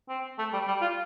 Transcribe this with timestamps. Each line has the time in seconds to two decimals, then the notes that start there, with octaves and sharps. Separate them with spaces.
0.09 C4
0.39 A3
0.53 G3
0.68 G3
0.81 F4